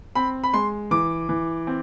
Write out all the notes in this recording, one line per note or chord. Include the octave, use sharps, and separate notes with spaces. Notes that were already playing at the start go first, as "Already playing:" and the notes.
C4 B5
B5
G#3 C6
E3 D6
E3
C4